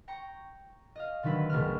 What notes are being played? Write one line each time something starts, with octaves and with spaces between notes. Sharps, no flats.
G5 A#5 C#6
D#5 F5
D3 D#3 F#3 E4 B4
F#1 B1 C#3 A3 F6